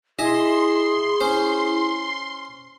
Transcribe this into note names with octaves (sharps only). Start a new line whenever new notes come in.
E4 G#4 D#5 G#5 C6
C#4 C5